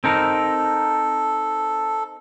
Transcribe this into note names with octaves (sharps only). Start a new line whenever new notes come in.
C4 D#4 A4 A#4